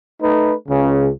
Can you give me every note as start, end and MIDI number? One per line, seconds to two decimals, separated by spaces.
0.21 0.53 57
0.21 0.53 63
0.21 0.53 71
0.69 1.09 37
0.69 1.09 49